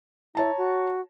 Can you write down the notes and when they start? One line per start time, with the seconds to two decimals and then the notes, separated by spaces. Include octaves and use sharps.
0.35 E4 C#5 A5 A#5
0.57 F#4